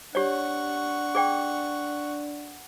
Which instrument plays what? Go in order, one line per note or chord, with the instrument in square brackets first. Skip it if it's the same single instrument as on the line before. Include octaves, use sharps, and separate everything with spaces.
[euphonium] D4 [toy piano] G4 C#5 D5 [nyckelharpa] F#5 C#6
[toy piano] G#4 D5 G5